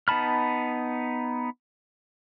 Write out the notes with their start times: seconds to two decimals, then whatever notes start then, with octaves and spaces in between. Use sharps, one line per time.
0.08 B3 D#4 A5 B5 F6